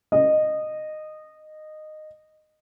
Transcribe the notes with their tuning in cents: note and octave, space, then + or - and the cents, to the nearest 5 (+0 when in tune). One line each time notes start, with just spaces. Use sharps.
D#5 -15